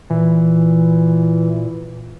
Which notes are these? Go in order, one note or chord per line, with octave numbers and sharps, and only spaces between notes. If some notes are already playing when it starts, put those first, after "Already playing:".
A#2 E3